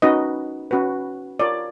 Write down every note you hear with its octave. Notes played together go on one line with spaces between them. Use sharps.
C#4 D#4 F#4 B4 D#5
C#4 F#4 B4
F4 A#4 C#5 D5